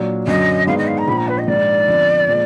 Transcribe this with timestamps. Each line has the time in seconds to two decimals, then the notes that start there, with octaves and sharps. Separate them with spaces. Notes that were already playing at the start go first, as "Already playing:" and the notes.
Already playing: A#2 F#3 D4
0.27 F#2 D3 F#3 D#5
0.67 G#2 D#3 G#3 B3 D4 F5
0.78 D#5
0.87 F5
0.98 A#5
1.08 A#1 A#2 F3 B5
1.17 A#5
1.28 B4
1.38 D#5
1.47 A#1 G#2 D#3 D5
1.87 F2 D3 F3 B3
2.28 A#2 F3 G#3